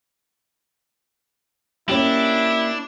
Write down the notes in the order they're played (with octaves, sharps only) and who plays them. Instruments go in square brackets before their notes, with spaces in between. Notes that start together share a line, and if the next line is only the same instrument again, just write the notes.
[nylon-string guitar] A#3 C#4 G4 [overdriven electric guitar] D4 [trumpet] E4